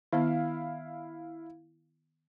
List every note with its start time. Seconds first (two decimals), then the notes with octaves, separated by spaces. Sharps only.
0.13 D#3 B3 E4 F5